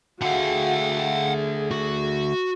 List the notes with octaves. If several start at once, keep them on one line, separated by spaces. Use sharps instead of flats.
D3 A3 F#4 G#4 F5 F#5
G#4
F#4